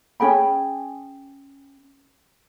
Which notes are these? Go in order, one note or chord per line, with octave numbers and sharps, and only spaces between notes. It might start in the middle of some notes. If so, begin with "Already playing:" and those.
C#4 G#4 G5 B5